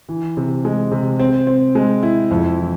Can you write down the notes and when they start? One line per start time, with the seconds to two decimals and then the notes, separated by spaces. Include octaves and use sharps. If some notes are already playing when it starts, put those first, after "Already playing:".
0.09 E3
0.37 C3
0.65 G#3
0.92 C3
1.20 C4
1.47 C4
1.75 G#3
2.03 E4
2.31 F2
2.59 E3